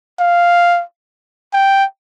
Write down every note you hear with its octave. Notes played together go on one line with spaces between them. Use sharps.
F5
G5